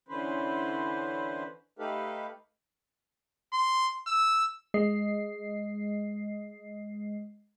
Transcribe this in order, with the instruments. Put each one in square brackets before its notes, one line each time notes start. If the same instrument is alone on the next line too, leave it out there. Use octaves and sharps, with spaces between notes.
[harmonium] D3 E3 C#4 B4 C5
A3 D#4 G4 A4 B4 F5
[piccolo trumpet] C6
E6
[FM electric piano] G#3 D#5 C7